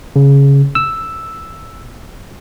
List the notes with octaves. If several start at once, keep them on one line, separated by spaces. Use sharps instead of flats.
C#3
E6